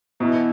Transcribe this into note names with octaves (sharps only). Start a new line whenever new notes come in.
B2 E3 B3 E4